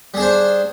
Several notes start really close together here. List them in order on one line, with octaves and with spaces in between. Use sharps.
G3 G#4 D4 C5